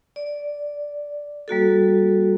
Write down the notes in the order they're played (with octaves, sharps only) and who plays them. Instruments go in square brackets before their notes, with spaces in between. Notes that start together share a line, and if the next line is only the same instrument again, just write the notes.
[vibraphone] D5
G3 A#3 F#4 A4